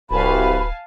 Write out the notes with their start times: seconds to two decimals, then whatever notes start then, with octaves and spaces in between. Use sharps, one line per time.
0.11 D1 C2 F#4 B4 F5 G#5 A5 B5